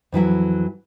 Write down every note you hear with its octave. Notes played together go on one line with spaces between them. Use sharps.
F2 E3 F#3 E4